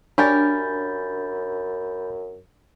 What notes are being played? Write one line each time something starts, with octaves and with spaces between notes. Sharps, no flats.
F#2 C#4 D4 G4 A#4 B5 G6 A6